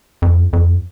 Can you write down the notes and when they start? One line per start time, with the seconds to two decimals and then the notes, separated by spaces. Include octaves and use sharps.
0.22 F2
0.53 F2